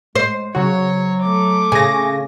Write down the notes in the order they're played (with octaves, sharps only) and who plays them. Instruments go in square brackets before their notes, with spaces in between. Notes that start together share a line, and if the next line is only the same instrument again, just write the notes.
[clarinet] G#3 [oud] C5
[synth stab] C#3 F#4 [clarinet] F#3 [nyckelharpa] C#5
[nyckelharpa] A3 D6
[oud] C#3 [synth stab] G#5 A#6